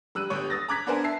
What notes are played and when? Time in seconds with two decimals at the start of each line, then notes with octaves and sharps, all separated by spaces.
0.15 G3 E6 F#6 D#7
0.30 G1 G4 C#5
0.50 D#6 A6 A#6
0.69 A#5 D6 F#6 G#6 B6
0.87 B3 D4 A#4 C5 G#5
1.04 E5 A5 C7